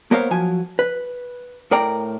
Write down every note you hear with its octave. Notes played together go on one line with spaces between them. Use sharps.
A#3 B3 A#4 C5 C#5 F5
F3 F#3 G#5
B4
A2 A#4 D5 G5 A#5